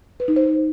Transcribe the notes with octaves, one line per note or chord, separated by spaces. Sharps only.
B4
D#4
C5